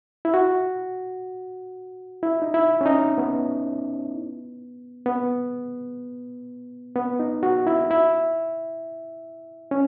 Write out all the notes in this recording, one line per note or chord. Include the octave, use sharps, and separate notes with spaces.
E4
F#4
E4
D#4
E4
C#4
D#4
B3
B3
B3
D#4
F#4
E4
E4
C#4